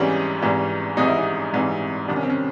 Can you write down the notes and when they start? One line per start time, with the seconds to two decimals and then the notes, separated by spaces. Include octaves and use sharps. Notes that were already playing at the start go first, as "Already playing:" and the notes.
Already playing: G#1 G#2 E3 G3 C#4
0.42 G#1 G#2 E3 G3
0.97 G#1 G#2 E3 G3 D#4
1.07 E4
1.19 D#4
1.53 G#1 G#2 E3 G3
2.08 C2 C3 D#3 D4
2.16 C#4
2.23 C4
2.30 C#4